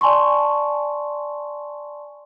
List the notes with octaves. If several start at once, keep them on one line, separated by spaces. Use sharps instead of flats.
D5 G#5 A5 C6 C#6